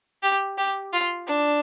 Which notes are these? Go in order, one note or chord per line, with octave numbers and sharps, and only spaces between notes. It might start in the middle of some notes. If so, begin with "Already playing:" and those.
G4
G4
F4
D4